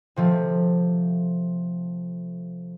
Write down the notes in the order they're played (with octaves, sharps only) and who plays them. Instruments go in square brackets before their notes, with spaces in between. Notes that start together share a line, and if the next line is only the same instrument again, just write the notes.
[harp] C3 F3 A3